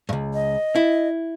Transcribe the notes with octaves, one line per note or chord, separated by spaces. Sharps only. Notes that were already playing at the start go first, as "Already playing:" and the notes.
C#2 G2
D#5
E4